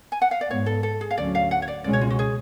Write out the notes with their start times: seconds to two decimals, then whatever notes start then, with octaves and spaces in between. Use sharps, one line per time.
0.12 G#5
0.22 F#5
0.31 F5
0.41 D5
0.50 G#2 G#3 B3 C#5
0.66 A4
0.83 A4
1.01 G#4
1.11 F5
1.17 D2 D3 F#3 C#4 D5
1.35 F5
1.51 F#5
1.62 C#5
1.68 D5
1.84 C#2 B2 G#3 C#4 D5
1.93 C#5
2.01 F4
2.10 F#4
2.19 G#4